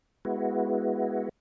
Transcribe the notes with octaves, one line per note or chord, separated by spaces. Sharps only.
G#3 B3 E4 F#4